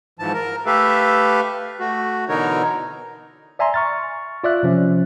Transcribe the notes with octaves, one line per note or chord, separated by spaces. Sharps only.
G#2 E3 F3 A5
A#4
A3 G4 A4 B4 E5 F5
A3 F#4
B2 D3 E3 D#4 A#4 C#5
D5 E5 G#5 A#5 C6
C#6 F6 A6
F4 D5 E5 F#6
C3 F3 C#4